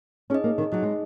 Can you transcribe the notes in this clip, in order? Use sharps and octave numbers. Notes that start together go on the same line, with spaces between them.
C#4 D#4 G#4 D#5
A#3
D#3
F#3 D#4 G#4 D#5
G#3